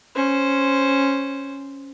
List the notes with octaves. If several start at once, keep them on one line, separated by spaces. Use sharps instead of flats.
C#4 C5